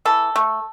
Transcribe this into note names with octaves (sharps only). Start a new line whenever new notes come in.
E3 A4
A3